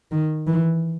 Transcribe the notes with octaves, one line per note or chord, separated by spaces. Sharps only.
D#3
E3